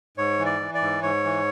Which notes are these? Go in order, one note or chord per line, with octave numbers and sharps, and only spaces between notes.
G#2 C#5
E3
D5
E3
D5
G#2
G#2 C#5
E3